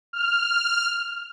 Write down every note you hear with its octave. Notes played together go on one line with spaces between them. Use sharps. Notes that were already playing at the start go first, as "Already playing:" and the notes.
F6